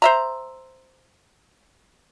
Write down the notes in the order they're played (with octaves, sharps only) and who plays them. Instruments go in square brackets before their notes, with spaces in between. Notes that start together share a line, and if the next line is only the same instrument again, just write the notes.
[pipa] C5 E5 A#5